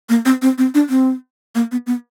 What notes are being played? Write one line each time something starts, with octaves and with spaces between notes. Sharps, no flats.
A#3
C4
C4
C4
D4
C4
A#3
B3
B3